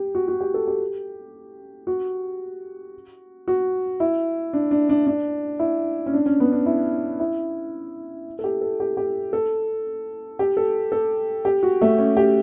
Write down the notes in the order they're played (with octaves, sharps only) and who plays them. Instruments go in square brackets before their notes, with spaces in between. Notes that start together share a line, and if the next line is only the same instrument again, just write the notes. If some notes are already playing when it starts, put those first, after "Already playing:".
Already playing: [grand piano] G4
F#4
F#4
G4
A4
G4
F#4
F#4
E4
D4
D4
D4
D4
E4
C#4
D4
C#4
B3
D4
E4
E4
A4
G4
A4
G4
G4
A4
G4
A4
A4
G4
F#4
A3
C#4
G4